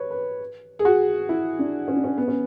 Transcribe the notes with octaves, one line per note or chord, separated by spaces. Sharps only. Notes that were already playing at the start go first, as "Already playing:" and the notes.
Already playing: B4 C#5
B4
G#4
F#4
E4
D4
C#4
D4
C#4
B3
C#4